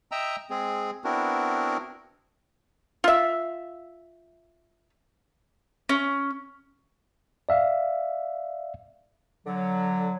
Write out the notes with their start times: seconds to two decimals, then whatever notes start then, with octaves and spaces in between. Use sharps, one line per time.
0.12 D#5 E5 G5 A#5 E6
0.50 G#3 C4 G#4
1.04 B3 C4 D4 E4 F#4 A#4
3.04 F4 E5
5.89 C#4
7.49 D5 E5 F5
9.46 D3 F#3